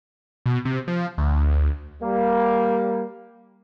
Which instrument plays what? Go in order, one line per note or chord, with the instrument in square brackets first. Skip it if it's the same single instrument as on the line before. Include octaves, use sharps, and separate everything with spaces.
[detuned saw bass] B2
C3
F3
D2
[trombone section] G3 A#3